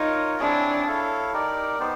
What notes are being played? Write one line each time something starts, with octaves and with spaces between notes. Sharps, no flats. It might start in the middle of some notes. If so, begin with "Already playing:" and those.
Already playing: D#4 F4 A#4 C#5
C4 D4 E4 G#4 C#5
E4 A4 C#5 F5
D#4 G4 A#4 D5
B3 D#4 G4 C5